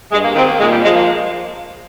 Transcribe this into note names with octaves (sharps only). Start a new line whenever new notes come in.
G2 G#3
A#3
D#3 C4
A#3
A#2 G#3
G3
F3 G#3
A#3